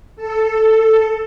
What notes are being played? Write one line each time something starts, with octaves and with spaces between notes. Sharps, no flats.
A4